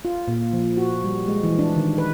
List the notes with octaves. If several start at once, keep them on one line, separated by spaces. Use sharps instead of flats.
F4
A#2
F3
F#4
G3
G#3
E3
D4
D#3
B4